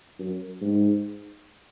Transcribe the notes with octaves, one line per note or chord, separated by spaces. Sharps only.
F#2
G#2